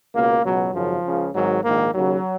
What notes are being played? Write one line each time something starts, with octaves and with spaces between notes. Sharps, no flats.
C#2 B2 A#3
C#2 B2 F#3
G#1 F#2 C#3 F3
C#2 C#3
G#1 G#2 D#3 F#3
A#1 G#2 D#3 A#3
D#2 C#3 F#3